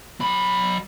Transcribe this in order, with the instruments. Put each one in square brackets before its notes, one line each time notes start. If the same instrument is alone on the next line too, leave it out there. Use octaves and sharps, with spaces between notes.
[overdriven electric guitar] F#3 B5